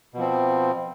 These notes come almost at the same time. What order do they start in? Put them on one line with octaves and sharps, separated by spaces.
B2 F3 C4